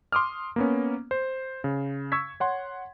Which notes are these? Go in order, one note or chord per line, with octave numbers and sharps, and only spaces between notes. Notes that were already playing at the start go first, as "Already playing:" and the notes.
C6 D6 D#6 F6
A#3 B3 C#4
C5
C#3
C#6 E6 G#6 B6
C#5 F#5 C6